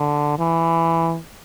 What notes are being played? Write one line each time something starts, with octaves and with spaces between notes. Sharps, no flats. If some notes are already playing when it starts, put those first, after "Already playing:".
Already playing: D3
E3